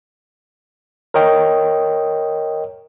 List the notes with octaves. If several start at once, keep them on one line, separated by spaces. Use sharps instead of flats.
A#4 C#5 D#5 G5